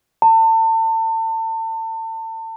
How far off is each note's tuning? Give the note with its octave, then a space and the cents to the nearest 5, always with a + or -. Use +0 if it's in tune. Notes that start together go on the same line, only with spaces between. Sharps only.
A5 +35